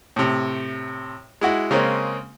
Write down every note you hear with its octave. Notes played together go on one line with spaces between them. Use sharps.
A2 C3
G#3 E4 F#4
C#3 G#3 A#3 C4 C#4